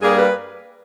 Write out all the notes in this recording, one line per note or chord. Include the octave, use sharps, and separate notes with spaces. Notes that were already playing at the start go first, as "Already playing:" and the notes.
G2 G3 A#3 G#4
B4